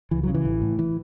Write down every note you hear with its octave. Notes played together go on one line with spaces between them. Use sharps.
C#2 E3
F#3
C#3
E3
A1
A2
E3